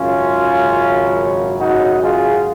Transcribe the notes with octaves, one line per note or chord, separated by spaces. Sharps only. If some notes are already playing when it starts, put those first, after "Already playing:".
Already playing: G#1 F#2 C#3 C#4 F4
D#4 F#4
F4 G#4